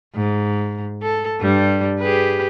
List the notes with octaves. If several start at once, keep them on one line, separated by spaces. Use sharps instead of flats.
G#2
A4
G2 G3
G4 G#4 B4